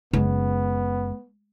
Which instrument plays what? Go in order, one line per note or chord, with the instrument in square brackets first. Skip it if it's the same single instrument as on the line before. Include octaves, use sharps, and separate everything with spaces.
[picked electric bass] F#1 C#3 [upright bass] G#3 [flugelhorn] B3